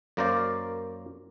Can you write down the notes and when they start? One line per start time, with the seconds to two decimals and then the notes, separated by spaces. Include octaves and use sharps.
0.17 F#2 A#3 A#4 C5 D5 F5